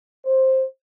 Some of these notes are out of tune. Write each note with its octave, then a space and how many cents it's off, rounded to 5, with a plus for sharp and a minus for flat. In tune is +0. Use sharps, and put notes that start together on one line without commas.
C5 +10